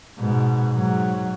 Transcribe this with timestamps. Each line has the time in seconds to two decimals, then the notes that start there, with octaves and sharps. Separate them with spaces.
0.19 G#2 B2
0.74 G#2 F#3